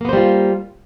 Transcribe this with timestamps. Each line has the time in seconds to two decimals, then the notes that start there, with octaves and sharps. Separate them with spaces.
0.01 A#3
0.05 B3
0.09 C5
0.13 G3
0.17 F4